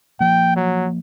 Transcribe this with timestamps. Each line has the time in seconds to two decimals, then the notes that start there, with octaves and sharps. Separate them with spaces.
0.20 F3 A#3 G5
0.56 F#3